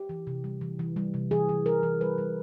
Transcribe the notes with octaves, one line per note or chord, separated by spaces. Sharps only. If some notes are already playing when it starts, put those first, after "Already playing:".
Already playing: G4
E3
C3
G3
E3
E3
G3
C3
E3 G#4
E3
G3 A#4
E3
G3 B4
G3